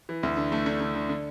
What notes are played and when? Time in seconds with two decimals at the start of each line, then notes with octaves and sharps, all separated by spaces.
0.09 E3
0.23 D2
0.37 D3
0.52 A3
0.66 D3
0.81 D3
0.95 D3
1.09 D3